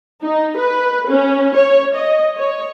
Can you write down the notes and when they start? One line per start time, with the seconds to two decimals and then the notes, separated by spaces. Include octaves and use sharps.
0.23 D#4
0.58 B4
1.09 C#4
1.56 C#5
1.95 D#5
2.37 C#5